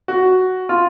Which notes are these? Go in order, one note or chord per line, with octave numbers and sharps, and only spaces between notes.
F#4
F4